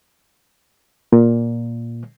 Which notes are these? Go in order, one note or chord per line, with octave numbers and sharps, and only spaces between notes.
A#2